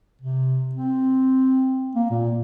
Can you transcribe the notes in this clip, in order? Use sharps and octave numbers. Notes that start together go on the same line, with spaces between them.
C3
C4
A#3
A#2